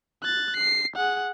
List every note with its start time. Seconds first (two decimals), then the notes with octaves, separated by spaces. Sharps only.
0.22 F#6 A6
0.57 C7
0.96 G#4 F#5